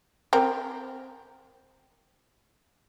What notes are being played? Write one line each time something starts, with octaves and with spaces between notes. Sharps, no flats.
C4 A#4